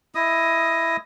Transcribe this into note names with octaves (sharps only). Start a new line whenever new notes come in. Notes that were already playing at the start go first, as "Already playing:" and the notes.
E4 D#5 D#6